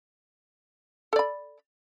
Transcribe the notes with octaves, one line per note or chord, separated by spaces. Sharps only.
A4 D5 B5